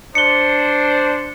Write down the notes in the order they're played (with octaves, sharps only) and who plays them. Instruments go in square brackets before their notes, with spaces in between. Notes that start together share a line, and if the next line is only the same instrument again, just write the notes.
[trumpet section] D4 C5 [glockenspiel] C#7 G7